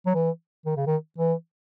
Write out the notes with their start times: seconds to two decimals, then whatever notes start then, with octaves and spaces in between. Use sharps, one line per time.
0.06 F#3
0.15 E3
0.66 D#3
0.77 C#3
0.87 D#3
1.18 E3